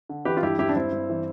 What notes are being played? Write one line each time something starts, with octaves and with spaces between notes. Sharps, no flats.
D3
E3 G4 B4
F4
G2 E4 G4
G2 E4 G4
D4
G2 C4 E4
G2
E3